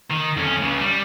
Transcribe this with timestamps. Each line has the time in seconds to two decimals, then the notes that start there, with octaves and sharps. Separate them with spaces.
0.10 D#3
0.37 F2 C#4
0.62 C#2 C#3
0.79 G3